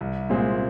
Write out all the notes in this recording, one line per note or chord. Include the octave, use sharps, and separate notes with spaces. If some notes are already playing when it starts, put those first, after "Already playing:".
C2
A#2 G#3 C4